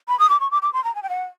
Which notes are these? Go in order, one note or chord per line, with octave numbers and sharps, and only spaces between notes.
B5
D#6
D6
C#6
D6
D6
C6
A#5
G#5
G5
F#5